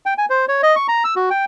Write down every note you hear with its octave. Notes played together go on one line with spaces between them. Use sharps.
G5
G#5
C5
C#5
D#5
C#6
A#5
E6
F#4
G5